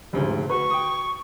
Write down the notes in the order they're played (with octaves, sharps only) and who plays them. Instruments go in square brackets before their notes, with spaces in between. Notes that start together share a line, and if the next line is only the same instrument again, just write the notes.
[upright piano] F1 D2 G#2
[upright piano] F#4 B4 [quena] C#6
[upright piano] G5 D#6